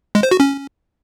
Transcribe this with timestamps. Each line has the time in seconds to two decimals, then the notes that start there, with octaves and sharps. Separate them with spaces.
0.15 G#3
0.23 C5
0.31 F#4
0.40 C#4